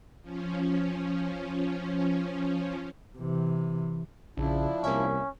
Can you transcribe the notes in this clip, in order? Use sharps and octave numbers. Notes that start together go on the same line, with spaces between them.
F3 C#4
C3 E3
A#1 C#3 F3 D4 E4
C2 A#3 C#4 E5